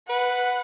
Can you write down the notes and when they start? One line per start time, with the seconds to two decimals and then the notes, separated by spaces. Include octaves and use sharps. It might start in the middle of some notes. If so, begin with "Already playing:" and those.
0.09 B4 F#5